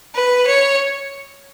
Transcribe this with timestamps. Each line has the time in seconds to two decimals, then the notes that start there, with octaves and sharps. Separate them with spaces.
0.14 B4
0.46 C#5